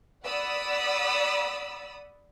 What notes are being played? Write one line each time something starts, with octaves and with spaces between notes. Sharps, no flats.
D5 F#5 B5 D#6 E6